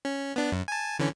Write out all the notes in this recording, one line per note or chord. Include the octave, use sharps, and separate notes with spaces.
C#4
B3 D4
F#2
G#5 A5
D3 E3 C#4